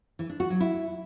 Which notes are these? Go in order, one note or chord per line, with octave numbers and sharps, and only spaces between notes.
E3
D4
F#4
F#3
E4